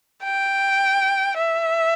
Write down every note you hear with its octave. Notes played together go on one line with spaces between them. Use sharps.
G5
E5